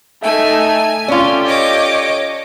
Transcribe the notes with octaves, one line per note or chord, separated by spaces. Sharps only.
A3 D#4 E5 G#5
C#4 F4 G4 A4 D5
C#5 D#5 D6